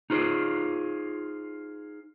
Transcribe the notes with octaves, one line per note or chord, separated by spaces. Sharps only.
D#4 F4 G#4 C5